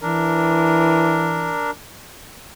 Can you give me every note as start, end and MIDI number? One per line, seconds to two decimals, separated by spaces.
0.01 1.57 52
0.01 1.71 62
0.01 1.71 70